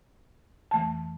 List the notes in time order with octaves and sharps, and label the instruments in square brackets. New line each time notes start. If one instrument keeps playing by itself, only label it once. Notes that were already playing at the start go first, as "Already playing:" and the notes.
[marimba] F2 E3 A3 A5